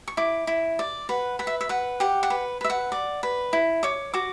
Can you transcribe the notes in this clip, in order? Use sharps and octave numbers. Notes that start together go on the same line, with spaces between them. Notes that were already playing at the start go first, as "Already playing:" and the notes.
C#6
E4 D6
E4
D5
B4 F#5
B4 F#5
E5
E5
B4 F#5
G4 F#5
F#5
B4
B4 E5
F#5
D5
B4
E4
C#5 D6
F#4 D6